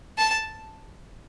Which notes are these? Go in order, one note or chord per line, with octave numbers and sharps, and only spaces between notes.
A5